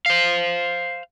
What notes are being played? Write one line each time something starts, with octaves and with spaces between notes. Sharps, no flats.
C5 F5